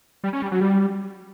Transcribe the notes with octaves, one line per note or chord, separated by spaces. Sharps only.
G3
C#4
G3
F#3
G3